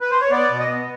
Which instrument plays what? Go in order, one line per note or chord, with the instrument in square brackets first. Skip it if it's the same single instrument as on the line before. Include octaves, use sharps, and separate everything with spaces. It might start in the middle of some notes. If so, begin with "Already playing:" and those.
[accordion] B4
C5
C#5
B3 D5
B2
D#5
B3